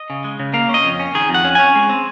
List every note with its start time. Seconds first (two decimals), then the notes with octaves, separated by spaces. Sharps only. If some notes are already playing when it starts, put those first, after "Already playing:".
Already playing: D#5
0.10 C#3
0.24 G#3
0.40 C#3
0.54 A#3 F5
0.69 C#4 D#5
0.84 F2
0.99 C#4
1.15 D#3 G#4
1.29 F2
1.34 F#5
1.44 C#4
1.55 C#4 G#5
1.75 G#3
1.90 C4